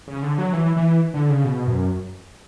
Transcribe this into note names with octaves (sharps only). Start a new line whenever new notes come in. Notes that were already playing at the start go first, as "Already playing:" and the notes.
C#3
D3
F#3
E3
E3
D3
C#3
B2
F#2